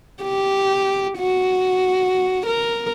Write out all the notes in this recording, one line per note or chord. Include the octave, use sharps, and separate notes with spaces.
G4
F#4
A#4